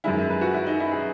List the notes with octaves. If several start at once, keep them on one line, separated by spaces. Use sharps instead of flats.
F#2 D#3 G#3 E4
B4
F#4
E4
D#4
E4
G#4